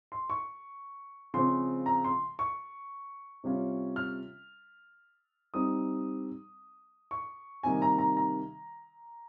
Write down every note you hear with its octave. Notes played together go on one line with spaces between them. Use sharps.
C6
C#6
C#3 F3 G#3 C4 C6
A#5
C6
C#6
C3 G3 C#4 F4
F6
G3 C4 D#4 D#6
C#6
C3 D#3 G3 A#3 D#4 G#5
A#5
A#5
A#5